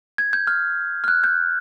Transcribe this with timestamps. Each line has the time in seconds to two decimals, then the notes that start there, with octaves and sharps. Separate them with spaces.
0.18 G#6
0.33 G6
0.47 F6
1.04 F6
1.08 F#6
1.24 G6